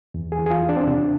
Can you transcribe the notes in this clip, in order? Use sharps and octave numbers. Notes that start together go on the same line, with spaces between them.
E2
G#4
E3
G#4
F4
E2
D4
C4
C3 D4